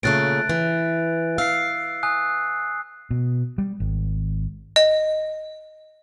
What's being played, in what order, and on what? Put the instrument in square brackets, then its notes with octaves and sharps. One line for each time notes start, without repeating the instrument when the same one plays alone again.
[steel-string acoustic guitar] A#2 C#3 A3 [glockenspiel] F#6 A6 D7
[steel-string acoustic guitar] E3
[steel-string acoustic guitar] F5 [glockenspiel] E6 C7
[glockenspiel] G#5 D#6 F#6
[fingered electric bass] B2
G3
G#1
[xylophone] D#5